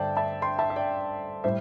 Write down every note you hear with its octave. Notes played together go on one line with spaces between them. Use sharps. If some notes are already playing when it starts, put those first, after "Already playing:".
Already playing: G2 D3 A3 C5 D5 E5 G5 A5
E5 A5
G5 C6
E5 A5
E5
D5 G5
A2 G3 C5 E5